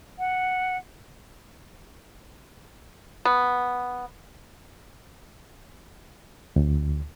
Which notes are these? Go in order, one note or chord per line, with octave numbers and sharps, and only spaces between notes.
F#5
B3
D2